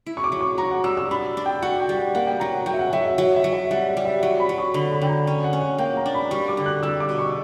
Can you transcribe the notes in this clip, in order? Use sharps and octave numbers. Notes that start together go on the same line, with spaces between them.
E4
C#6
D6
F#3
C#6
F#4 A#5
F#5
G3 E6
E6
D4 B5
D4
G5
F#4 F#5
G5
G3
F#5
A#3 F#5
G5
F#3 A#5
F#5
F#3 G5
E5
F#5
F#3 E5
E5
F#3 F#5
E5
F#3
E5
G3 F#5
F#5
G3
E5
F#3 F#5
B5
F#3
C#6
D3 B5
B5
D3 G5
A#5
C#4
F#5
C#4
F#5
A#3 G5
A#5
D4
B5
G3 C#6
D6
D3
F#6
G3 E6
D6
B2
C#6